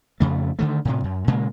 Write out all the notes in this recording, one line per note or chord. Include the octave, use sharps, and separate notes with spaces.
F2 C#3 A3
D3 D#3 A3
A2 C3
F#2
A#2 C#3 G#3 A#3